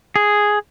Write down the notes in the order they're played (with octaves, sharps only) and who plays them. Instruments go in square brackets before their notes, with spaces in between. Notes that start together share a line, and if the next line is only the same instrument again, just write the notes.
[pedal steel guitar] G#4